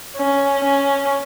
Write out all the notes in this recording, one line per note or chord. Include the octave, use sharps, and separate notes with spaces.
C#4
C#4